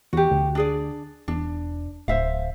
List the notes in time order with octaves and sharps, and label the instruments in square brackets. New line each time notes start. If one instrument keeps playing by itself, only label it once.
[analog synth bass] E2 [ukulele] F#4 G4
[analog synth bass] D2
[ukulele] D4 G#4 D5
[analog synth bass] E1 [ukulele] D4
[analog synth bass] D1 [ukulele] C5 E5 F5